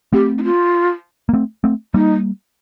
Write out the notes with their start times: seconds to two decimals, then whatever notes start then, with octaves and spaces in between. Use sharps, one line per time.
0.13 A3 C4 G4
0.38 D#4
0.44 F4
1.29 A#3
1.33 A3 C4
1.64 A3 C4
1.94 G3 A#3 D#4